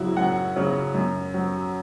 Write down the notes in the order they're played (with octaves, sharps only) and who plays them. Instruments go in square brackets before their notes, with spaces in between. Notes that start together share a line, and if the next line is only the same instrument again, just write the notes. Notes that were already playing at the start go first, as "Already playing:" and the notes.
Already playing: [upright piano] F#2 C#3 F#3 E4 F#4
F#2 F#5
C#3 F#3
F#2
F#3